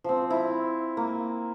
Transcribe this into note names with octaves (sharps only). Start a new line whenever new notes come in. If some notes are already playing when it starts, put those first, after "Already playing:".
F3 C4
E4
A#3